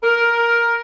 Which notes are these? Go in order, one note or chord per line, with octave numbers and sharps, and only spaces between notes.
A#4